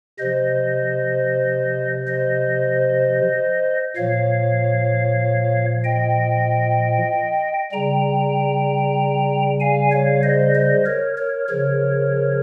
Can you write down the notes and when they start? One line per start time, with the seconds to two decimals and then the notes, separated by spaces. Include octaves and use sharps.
0.19 C3 F3 C5 D#5
2.07 C5 D#5
3.96 A#2 F3 C#5 F5
5.84 D#5 G5
7.72 C#3 G3 G5 A#5
9.60 F5 G#5
9.92 C#5 F5
10.23 C5 D#5
10.55 C5 D#5
10.86 A#4 C#5
11.17 A#4 C#5
11.49 C#3 F3 A#4 C#5